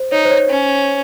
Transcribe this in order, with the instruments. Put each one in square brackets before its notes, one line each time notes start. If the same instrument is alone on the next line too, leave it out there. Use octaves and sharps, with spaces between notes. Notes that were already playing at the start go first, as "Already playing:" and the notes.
Already playing: [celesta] C5
[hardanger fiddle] D#4 [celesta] C#5
[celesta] C5
C#5
[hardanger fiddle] C#4